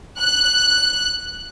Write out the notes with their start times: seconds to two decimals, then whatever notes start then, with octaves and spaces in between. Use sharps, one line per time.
0.19 F#6